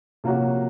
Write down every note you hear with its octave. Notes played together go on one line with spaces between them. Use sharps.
C3 F3 A#3 C#4 F#4